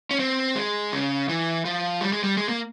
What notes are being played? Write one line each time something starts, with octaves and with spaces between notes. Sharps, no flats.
C#4
C4
G#3
C#3
E3
F3
G3
G#3
G3
G#3
A#3